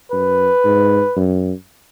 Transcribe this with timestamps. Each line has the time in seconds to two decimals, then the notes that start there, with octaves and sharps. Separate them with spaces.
0.12 F#2 B4
0.65 G#2
1.16 F#2